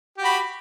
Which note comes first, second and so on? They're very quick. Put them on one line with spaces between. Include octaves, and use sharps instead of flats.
G4 F#4 B5